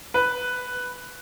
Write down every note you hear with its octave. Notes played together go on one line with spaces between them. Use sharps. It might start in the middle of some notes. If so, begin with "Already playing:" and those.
B4